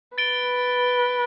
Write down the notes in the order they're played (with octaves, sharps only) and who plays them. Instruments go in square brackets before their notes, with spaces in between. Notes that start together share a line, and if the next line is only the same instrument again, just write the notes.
[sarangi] B4 [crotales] A6 D7 G7